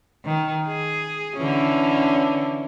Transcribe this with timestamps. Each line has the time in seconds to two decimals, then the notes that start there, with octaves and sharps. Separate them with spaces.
0.24 D#3
0.67 G#4
1.37 D3 E3 C#4